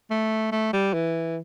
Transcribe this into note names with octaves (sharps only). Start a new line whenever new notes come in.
A3
A3
G3
E3